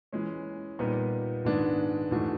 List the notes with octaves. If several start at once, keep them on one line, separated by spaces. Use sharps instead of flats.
E3 G#3 C#4
A#2 G3 B3 D#4
G#2 D#3 G#3 B3 D4
G#2 E3 A3 D4 F#4